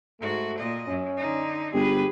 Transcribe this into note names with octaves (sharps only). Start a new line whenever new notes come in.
G#2 A3 F#4
A#2 D#5
F#2 C#4
D3 D#4
G1 G4 G#4 B4